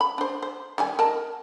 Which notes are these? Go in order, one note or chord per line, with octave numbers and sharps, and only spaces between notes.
B5
D4 C5
C5
D#3 G3 G#5
A#4 D#5 A5